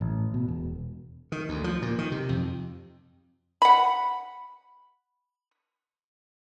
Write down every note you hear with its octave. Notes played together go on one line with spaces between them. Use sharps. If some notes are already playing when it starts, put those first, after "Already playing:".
A1
B2
E1
D#3
D2
F3
A#2
D#3
C3
F2
F#5 B5